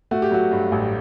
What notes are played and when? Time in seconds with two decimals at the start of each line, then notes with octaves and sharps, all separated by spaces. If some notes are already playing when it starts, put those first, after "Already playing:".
0.11 A3 F#4
0.22 G4
0.31 F#3 F#4
0.52 G2
0.72 A1